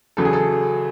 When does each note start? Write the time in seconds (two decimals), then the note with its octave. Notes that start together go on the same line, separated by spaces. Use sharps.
0.17 E2 C#3 F#3 A4
0.25 G#4
0.33 A4